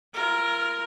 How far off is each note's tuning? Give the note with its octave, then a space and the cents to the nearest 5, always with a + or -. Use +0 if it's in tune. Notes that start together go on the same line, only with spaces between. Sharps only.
F4 -40 A#4 +5